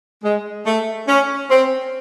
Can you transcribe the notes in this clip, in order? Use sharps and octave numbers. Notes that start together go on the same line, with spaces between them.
G#3
A3
C#4
C4